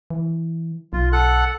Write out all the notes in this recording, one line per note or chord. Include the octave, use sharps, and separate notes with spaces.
E3
B1 F4
A4 F#5 F#6